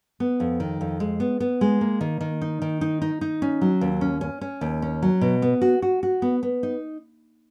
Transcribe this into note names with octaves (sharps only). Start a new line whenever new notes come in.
B3
F2
D#3
F2
G#3
B3
B3
G#3
A#3
D#3
D#3
D#4
D#3
D#4
D#4
D#4
C#4
F#3
D#2
C#4
C#4
C#4
D#2
C#4
F#3
B2
B3
F#4
F#4
F#4
B3
B3
D#4